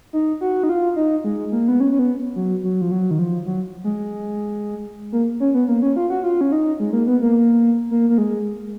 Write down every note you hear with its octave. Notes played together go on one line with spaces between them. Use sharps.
D#4
F#4
D#4
F4
D#4
G#3
A#3
B3
C#4
C#4
B3
F#3
F#3
F3
F#3
D#3
F3
F#3
G#3
A#3
C#4
B3
A#3
C#4
F4
F#4
F4
C#4
D#4
G#3
A#3
B3
A#3
A#3
A#3
G#3